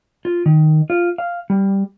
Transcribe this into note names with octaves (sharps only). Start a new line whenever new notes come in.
F4
D#3
F4
F5
G3